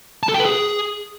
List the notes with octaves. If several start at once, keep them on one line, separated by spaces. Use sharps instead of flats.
A5
A4
G5
B4
G#4